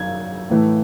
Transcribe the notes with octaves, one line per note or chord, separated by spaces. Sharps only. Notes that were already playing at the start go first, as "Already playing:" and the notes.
Already playing: F#2 G#6
A2 E3 A3